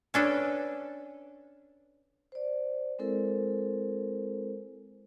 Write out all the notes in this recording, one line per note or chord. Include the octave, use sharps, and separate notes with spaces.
C#4 D4 A4 B4
C5 D5
G#3 C4 E4 A4 A#4 C5